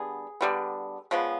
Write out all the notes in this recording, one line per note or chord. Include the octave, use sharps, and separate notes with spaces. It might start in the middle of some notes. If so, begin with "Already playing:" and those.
Already playing: D3 G3 B3 G#4
D3 G3 B3
C#3 F3 G#3 B3